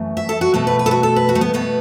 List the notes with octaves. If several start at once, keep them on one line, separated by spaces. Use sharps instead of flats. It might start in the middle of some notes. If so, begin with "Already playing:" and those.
Already playing: F#2 E3 A3
E5
A4
F#4
B2 A3 A4
B4
B4
A4
F#4
A4
B4
F#4
A3
B3
B2 A3 B3